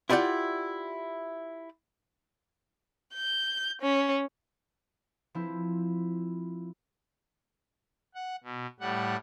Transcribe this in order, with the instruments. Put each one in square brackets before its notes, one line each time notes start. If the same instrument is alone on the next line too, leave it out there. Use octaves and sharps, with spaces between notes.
[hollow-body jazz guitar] E4 F4 G4 D5 F#5
[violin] G6
C#4
[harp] F3 C4 E4
[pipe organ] F#5
B2
A2 G3 F#5